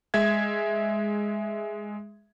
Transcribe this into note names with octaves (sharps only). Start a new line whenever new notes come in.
G#3 E5 G#6